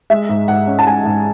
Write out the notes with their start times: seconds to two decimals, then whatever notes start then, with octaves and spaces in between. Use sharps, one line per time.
0.10 G#3 E5
0.29 G#2
0.48 G#2 F#5
0.67 C#4
0.79 A5
0.86 G#3 G#5
1.05 G#2